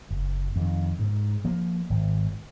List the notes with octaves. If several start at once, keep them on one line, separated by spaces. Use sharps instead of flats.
F#1
F2 D#3
G#2
F3 A#3
G#1